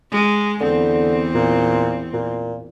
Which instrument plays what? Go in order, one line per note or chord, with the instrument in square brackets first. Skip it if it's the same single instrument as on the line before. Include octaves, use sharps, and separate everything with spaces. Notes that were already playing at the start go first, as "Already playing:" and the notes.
[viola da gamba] G#3
[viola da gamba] E2 C4 [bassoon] D3
[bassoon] A#2
A#2